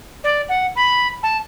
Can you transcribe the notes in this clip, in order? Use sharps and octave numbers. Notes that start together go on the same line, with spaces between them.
D5
F#5
B5
A5